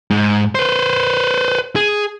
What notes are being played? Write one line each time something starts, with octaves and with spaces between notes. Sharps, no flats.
G#2
B4 C5
G#4